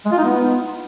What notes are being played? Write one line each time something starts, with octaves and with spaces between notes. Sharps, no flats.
G#3
F4
D#4
B3